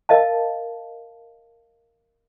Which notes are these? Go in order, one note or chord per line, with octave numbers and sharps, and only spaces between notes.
A#4 D#5 F5 A5